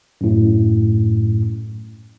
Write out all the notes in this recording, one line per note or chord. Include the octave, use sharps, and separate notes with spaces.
F#2 A2